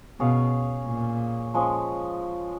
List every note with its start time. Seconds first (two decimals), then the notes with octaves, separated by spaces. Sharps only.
0.20 B2 C#4 G#4 C#5 F5
0.87 A#2
1.54 F3 G#3 C#4